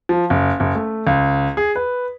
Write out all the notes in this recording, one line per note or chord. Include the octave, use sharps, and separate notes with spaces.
F3
F#1
F#1
A3
C#2
G#4
B4